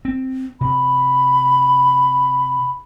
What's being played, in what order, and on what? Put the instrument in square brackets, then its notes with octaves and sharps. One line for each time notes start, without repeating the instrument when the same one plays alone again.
[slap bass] C4
[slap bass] C3 [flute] B5